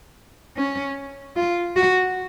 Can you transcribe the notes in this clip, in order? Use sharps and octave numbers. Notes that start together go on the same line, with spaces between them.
C#4
F4
F#4